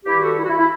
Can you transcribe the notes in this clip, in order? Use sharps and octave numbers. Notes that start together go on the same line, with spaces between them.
G2 D#3 E4 G4
F#4 A4
E4
F#4
E4
E4